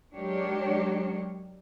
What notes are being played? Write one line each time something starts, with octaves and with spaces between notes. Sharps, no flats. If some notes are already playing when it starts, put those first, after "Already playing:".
F#3 G#3 D4 G4 A#4 C#5